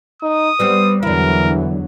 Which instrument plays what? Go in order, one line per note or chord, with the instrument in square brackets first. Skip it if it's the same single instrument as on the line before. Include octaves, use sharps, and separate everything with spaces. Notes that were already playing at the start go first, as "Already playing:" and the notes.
[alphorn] D#4 [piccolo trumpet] D#6
[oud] G3 B3 C4 [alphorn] B4
[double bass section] E2 D3 F#3 [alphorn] E3 [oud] D4 E4 [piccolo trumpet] A#4